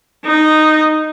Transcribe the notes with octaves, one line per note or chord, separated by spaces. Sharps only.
D#4